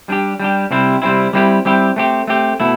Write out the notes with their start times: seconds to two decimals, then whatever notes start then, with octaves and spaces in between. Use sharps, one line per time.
0.09 G3 D4 G4
0.40 G3 D4 G4
0.71 C3 G3 C4 E4
1.02 C3 G3 C4 E4
1.33 G3 C4 E4 G4
1.65 G3 C4 E4 G4
1.96 A3 C4 G4
2.27 A3 C4 G4
2.60 B2 A3 E4